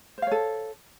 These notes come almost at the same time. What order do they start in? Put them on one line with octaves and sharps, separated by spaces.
C5 F5 C#5 A4